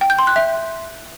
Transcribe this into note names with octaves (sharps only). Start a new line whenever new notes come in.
G5
G6
C6
F#6
E5